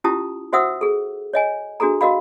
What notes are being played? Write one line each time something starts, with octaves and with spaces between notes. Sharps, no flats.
C#4 E4 F4 G4 A5 D#6
F#4 C5 E5 F#5 D#6 E6
G#4 A4
C#5 D#5 G#5
D4 F#4 G#4 A4 A#5
F#4 A#4 D#5 F5 B5